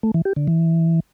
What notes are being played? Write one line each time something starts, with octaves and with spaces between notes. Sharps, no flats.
A3
E3
G4
D3
E3